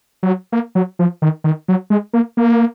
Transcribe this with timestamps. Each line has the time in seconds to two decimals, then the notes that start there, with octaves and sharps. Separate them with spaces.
0.23 F#3
0.52 A#3
0.75 F#3
0.99 F3
1.22 D#3
1.44 D#3
1.68 F#3
1.90 G#3
2.13 A#3
2.37 A#3